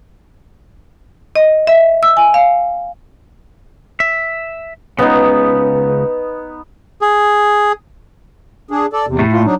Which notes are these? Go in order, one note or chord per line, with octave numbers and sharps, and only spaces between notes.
D#5
E5
E6
G#5
F5
E5
C#2 G#2 C#3 B3 D#4
G#4
D4 G#4
A4 D5
E2 C3
A2 A3
A#2 F4
F#3 D4 D#4